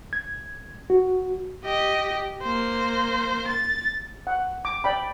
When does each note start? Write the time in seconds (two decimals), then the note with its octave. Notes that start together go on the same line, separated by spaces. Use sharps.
0.13 G#6
0.90 F#4
1.64 G4 D#5
2.42 A#3 C5
3.48 A6
4.27 F#5
4.65 D6
4.84 D5 G5 B5